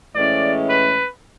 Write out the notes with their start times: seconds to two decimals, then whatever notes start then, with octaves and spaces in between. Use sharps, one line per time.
0.15 A2 E3 G#3 C#4 D5
0.70 B4